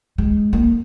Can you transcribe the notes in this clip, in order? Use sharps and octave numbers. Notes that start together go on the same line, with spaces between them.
G#3
A#3